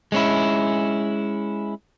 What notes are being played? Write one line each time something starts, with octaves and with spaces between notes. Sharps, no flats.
G#3 C#4 E4